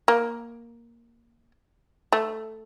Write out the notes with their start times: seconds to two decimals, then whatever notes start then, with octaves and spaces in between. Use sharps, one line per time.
0.08 A#3
2.12 A3